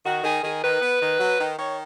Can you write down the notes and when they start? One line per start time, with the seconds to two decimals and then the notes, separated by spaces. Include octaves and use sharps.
0.05 D#3 F#4
0.24 D#3 G#4
0.43 D#3 G#4
0.62 D#3 B4
0.81 B3
1.00 D#3
1.20 F#3
1.39 D#3
1.58 D#3 C#5